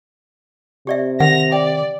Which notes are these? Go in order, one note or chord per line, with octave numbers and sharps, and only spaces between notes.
C3 G4 D5 E5
D#3 F#5 A#6 F7
D5 G5